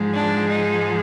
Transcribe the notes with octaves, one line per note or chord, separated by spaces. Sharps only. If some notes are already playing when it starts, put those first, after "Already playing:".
Already playing: G#2 F3 G#3
D4
D#4